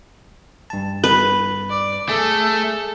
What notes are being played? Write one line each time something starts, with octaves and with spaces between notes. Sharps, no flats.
G2 A5
B4
D5
A3 G#4 A4